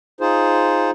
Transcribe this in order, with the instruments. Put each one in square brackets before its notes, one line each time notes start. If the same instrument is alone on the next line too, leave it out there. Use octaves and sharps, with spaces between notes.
[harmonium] D#4 F4 G#4 C5